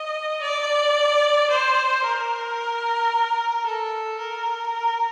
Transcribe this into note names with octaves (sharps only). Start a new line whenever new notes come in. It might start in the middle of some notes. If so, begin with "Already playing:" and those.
Already playing: D#5
D5
C5
A#4
A4
A#4